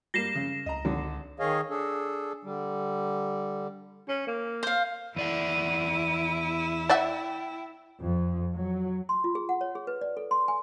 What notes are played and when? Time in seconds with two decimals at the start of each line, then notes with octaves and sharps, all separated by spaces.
0.14 G3 A#3 A#6 C7 E7
0.35 C#3
0.66 C#2 D#5 A#5
0.85 G#1 D3
1.39 D#3 G#4 C#5 D#5 F5
1.70 D4 G#4 A4
2.44 D3 G3
4.09 C#4
4.27 A#3
4.63 C5 F5
5.16 E2 E4 D5 F#5 D#7
6.89 D5 E5 F#5 G5
8.01 F2
8.55 F#3
9.09 C6
9.24 F4
9.35 G#4
9.49 F#5
9.61 C#5
9.75 G#4
9.87 B4
10.01 D5
10.17 A4
10.31 C6
10.48 G#5